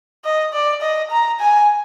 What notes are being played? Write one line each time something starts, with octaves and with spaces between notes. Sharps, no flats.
D#5
D5
D#5
A#5
G#5